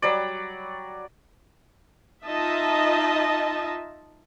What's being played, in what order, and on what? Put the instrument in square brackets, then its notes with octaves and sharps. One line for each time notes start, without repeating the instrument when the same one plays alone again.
[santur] F#3 G3 D5
[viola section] D#4 F4 D#5 E5 A5